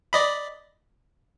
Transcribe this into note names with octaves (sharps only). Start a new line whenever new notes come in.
D5 D#5 B5